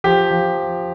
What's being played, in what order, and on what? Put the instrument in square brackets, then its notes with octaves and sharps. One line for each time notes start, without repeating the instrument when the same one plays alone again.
[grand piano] F3 G4
F3